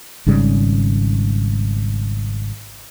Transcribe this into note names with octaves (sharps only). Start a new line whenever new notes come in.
G#1 G#2 C#3 G3